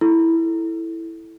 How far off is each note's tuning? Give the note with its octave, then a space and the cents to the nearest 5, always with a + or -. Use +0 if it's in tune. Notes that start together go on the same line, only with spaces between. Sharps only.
E4 +0 A4 -5